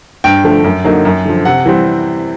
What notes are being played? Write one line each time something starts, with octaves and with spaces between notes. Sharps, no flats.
G2 G5
D3 F3 A3
F#2
D3 F#3 A#3 D#4
F#2
D3 F3
C3 F#5
E3 G3 C4